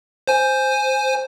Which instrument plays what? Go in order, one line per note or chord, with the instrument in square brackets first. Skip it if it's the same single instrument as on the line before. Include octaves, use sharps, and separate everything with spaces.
[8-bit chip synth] C5 G#5